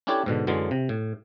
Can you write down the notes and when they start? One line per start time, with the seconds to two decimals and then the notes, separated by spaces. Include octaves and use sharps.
0.07 C#4 D4 E4 G4 A4 C#5
0.26 G#2 B2 D3
0.47 F#2 D3 E3 F#3 G#3
0.71 C3
0.89 A2